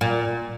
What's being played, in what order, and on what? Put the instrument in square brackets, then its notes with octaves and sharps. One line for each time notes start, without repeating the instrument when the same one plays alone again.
[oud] A#2